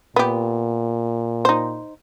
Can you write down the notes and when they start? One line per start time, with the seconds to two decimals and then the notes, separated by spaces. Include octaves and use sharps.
0.16 A#2 B3 G4
1.45 D#4 C5